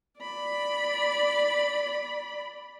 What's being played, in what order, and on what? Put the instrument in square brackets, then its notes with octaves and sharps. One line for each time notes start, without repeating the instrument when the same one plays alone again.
[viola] D5 B5